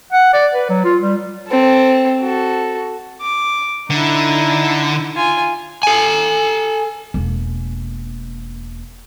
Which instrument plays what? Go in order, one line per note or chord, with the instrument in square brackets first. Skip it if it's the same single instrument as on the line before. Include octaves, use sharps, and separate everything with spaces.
[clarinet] F#5
D5
B4
F#3
F4
G3
[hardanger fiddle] C4 A4
F#4 A4
D6
[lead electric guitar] D3 [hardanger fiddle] D#4 E4
[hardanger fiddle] F4 G#5
[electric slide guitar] A4 G#5
[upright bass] E1 A#3